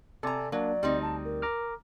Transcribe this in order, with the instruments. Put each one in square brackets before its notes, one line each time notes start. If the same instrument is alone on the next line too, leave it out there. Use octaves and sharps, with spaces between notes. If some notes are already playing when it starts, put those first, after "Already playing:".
[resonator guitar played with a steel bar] C3 A#5 [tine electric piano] A4 D5 G#5
[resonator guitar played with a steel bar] F#3 [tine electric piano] A#3 D4 [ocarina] D5
[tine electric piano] D2 [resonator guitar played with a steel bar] G3 C4 D#4
[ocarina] A5
A#4
[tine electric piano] A#5 D6 F6